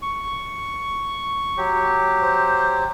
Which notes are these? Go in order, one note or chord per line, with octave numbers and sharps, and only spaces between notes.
C#6
F#3 G4
C5